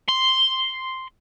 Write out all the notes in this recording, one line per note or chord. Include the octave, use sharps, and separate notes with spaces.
C6